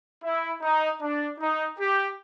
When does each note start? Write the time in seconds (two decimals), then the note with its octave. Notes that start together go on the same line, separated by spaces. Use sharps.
0.24 E4
0.62 D#4
1.01 D4
1.39 D#4
1.79 G4